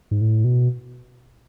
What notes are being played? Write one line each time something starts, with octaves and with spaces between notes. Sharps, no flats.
G#2
A2
B2